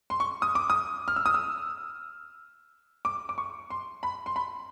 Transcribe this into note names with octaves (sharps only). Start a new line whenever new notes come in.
C6
C#6
D#6
D6
D#6
F6
E6
D#6
E6
D6
D6
C#6
C6
B5
C6
B5